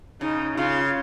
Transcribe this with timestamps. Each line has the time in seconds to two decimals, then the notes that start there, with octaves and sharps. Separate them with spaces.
0.21 C#3 D#4
0.57 C#3 F4